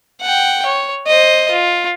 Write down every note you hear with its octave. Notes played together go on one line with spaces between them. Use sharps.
F#5 G5
C#5
C5 D#5
F4